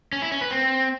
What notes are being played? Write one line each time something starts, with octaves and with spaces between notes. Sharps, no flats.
C#4
E4
C#4
B4
C4